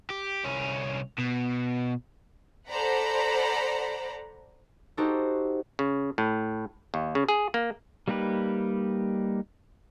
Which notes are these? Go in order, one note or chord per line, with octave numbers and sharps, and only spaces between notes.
G4
C2 C#4
B2
A4 C5 D5 F#5 A#5 B5
D#4 F#4 G4 A4 C5
C#3
A2
D#2
C#3
G#4
A#3
G3 A#3 D#4 G4 B4